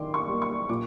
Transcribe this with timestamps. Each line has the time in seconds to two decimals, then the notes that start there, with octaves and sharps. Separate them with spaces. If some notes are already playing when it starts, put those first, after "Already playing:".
Already playing: D#3 C6 D6
0.14 C#6
0.27 G3 A#3
0.42 C#6
0.69 A#2 D6